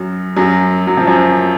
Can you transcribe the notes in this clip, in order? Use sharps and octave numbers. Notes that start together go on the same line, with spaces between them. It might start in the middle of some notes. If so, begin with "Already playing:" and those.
Already playing: F#2 F#3
F#2 F#3
F#3
F3
F#2 F#3